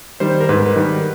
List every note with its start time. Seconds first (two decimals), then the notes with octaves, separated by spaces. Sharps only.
0.20 D#3 G3 C5
0.41 A#4
0.49 G#2 B4
0.76 D#3 G3